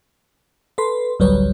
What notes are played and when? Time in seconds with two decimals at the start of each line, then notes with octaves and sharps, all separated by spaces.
0.78 A4 B4 B5 C6
1.19 A1 D2 F#3 G3 B4 C#5